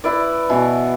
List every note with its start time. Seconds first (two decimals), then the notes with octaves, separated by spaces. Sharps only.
0.04 E4 B4 D5
0.50 B2 E3